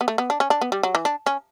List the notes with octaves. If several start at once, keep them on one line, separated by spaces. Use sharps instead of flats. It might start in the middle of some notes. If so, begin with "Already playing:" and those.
B3
A3
B3
D4
C#4
D4
B3
G3
F#3
E3
D4
C#4